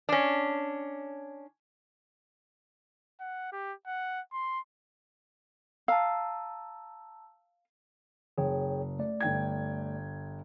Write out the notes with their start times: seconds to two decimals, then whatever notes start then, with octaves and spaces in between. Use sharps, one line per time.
0.09 C#4 D4
3.21 F#5
3.52 G4
3.87 F#5
4.33 C6
5.88 F5 A5 A#5 E6
8.38 F#1 G#4 C#5 G5
8.99 A3 D5
9.20 G1 G5 G#6